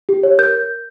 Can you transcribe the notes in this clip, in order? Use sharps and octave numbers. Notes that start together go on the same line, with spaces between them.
G4
C#5
A#4 G6